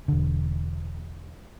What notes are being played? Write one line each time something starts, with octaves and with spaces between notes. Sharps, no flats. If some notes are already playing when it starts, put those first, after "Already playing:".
E1 D3